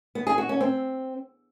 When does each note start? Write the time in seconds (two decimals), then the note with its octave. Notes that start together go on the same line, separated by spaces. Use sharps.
0.15 B3
0.27 G#4
0.38 F#4
0.49 C#4
0.61 C4